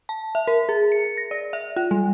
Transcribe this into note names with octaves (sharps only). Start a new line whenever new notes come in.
A5
E5
A#4
G#4
C#7
A#6
D5
E5
F4
G3